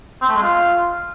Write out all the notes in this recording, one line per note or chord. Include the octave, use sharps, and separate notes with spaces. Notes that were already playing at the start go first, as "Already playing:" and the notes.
C4
A3
G#3
F4